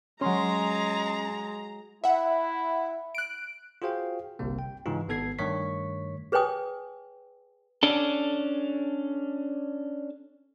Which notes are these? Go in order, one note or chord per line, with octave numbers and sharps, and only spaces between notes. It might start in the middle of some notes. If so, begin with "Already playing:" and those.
F#3 G#3 C#4 A#5 C6
E4 E5 F#5
F#6 D7
F4 F#4 G#4 C5 F5 G5
G1 C2 C3 A#3
G5
G#2 C#3 E3 D#4 F4
G#1 B3 A4 G#6 C7
G2 D#3 A3 C#5 C#6 B6
G#4 B4 C#5 G5 G#5 D#6
C#4 D4 A4